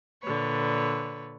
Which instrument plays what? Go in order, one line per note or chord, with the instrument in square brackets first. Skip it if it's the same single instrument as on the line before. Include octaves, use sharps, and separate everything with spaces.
[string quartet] A#2 D3 B4 C#5